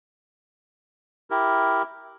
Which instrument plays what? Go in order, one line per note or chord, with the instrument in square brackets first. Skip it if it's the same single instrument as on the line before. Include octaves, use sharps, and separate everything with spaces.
[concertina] E4 G4 A#4